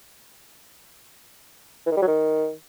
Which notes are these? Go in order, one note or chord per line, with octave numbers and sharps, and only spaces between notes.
E3
D#3
G3
F#3
D#3